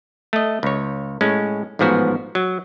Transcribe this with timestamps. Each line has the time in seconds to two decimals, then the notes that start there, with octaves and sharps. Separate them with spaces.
0.33 A3 D#5
0.63 C#2 C#5
1.21 A2 G#3 C#4
1.79 A1 G#2 F3 B3 F#4
2.35 F#3